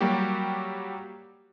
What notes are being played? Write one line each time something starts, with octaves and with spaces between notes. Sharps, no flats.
F#3 G3 A#3 F#4 G4